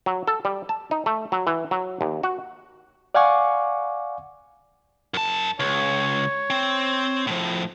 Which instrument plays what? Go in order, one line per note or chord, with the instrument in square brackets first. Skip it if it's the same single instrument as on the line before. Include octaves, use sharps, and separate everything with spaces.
[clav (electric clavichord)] F#3
A4
G3
A5
D#4
A3
F#3
E3
F#3
D#2
F#4
[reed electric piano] D5 F5 F#5 G#5 C#6 D6
[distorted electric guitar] F#2 A5
[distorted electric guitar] C#2 [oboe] C#5
[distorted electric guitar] C4
A2 F3